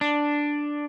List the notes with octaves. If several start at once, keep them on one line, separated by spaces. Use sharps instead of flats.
D4